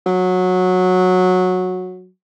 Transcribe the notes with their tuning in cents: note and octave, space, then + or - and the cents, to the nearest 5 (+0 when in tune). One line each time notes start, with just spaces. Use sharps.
F#3 -15